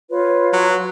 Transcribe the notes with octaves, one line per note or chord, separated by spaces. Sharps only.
F4 B4 C#5
F#3